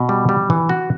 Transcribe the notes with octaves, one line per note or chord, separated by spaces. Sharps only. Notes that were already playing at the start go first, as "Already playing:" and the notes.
Already playing: B2
G3
G3
E3
F#4